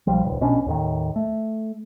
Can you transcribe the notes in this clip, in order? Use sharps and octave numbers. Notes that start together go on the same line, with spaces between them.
B1 F3 G3
D#1 C#2
A#1 B2 C#4 D4
D#2 A2 D#3
A3